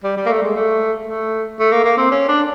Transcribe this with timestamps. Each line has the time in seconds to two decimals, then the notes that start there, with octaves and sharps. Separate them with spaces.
0.04 G3
0.17 G3
0.26 A#3
0.29 A3
0.43 G#3
0.56 A3
1.07 A3
1.60 A3
1.72 A#3
1.85 A#3
1.98 C4
2.11 C#4
2.29 D4